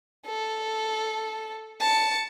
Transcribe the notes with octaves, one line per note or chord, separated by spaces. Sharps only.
A4
A5 C#7